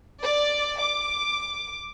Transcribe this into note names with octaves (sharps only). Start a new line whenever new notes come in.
D5
D6